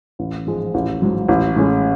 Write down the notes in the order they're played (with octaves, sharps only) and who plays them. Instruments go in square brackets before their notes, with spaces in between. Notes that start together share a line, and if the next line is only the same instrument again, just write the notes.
[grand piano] A1
G#2 F3 G#3
A1
G#2 F#3
A1
A2 G#3 C#4